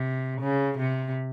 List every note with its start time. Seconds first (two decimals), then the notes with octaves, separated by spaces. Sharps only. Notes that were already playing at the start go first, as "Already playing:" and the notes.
Already playing: C3
0.41 C#3
0.78 C3